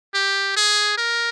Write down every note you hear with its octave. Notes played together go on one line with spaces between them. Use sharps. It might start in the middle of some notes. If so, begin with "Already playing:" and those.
G4
G#4
A#4